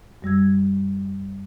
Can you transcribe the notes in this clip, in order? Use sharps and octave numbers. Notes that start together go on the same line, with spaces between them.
F#2 G3 E6 G#6